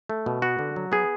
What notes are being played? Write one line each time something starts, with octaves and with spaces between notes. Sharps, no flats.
A3
B2
B3 F#4
D3
F#3
B3 G#4